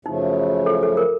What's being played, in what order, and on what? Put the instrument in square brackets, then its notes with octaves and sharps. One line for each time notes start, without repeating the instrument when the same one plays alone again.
[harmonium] F#2 C#3 F3 A3 [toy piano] D#4
[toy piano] A4
A4
A#4